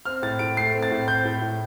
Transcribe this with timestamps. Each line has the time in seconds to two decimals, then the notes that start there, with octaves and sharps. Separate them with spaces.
0.05 C4 F6
0.22 A2 A6
0.39 A2 D7
0.57 A3 C7
0.74 C4
0.83 A6
0.91 A2
1.08 C4 G6
1.25 A2
1.41 A2